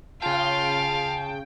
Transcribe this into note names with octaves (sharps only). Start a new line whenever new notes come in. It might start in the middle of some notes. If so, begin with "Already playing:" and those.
C#3 F4 F5 G5 A5